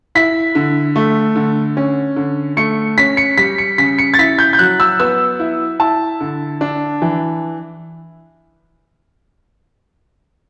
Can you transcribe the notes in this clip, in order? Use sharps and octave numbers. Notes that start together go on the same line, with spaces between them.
E4 B6
D3
A3
D3
C#4
D3
A3 C#7
C#4 B6
C#7
G3 B6
C#7
C#3 B6
C#7
A6
E4 B6
G6
G6
F#3 F#6
E6
B3 E6
E4
E4 A5
D3
D4
E3